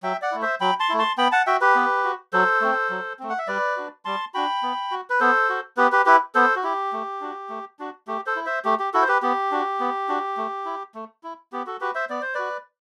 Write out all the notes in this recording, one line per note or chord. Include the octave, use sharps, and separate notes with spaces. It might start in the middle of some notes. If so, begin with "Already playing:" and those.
F#3 E5 G5
D5 F#5
A3 E4
C5 E5
F#3 G5 B5
A5 C6
A3 E4
A5 C6
B3 G5 B5
F#5 A5
F#4 E5 G5
G4 B4
B3
F#4
F#3 A4 C5
A3 C4
F#3
A3 C4
F#5
E5
G3 B4 D5
D4 F#4
G3 A5 C6
D4 F#4 G5 B5
B3
F#4
B4
B3 A4 C5
F#4
B3 G4 B4
G4 B4
E4 G4 B4
B3 A4 C5
F#4
E4 G4
A3
D4 F#4
A3
D4 F#4
A3 G4
A4 C5
E4
C5 E5
A3 G4
G4
E4 F#4 A4
C5
G4 B4
B3 G4
D4 F#4
B3
D4 F#4
A3
E4
A3
E4
B3 G4
F#4 A4
F#4 G4 B4
C5 E5
B3 D5
C5
F#4 B4 D5